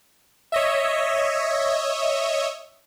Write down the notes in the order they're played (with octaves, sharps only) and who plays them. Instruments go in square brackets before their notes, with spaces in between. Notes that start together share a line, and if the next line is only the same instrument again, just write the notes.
[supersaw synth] C#5 D#5 E5